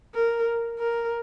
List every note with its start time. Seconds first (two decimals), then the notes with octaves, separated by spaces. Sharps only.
0.15 A#4
0.79 A#4